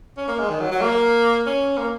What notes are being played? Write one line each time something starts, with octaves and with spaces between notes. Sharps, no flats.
C#4
A#3
G#3
D#3
F#3
F#3
A#3
C#4
A#3